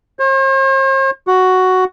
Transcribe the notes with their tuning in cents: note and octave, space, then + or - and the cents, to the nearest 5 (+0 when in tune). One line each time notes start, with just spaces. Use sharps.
C5 +45
F#4 +5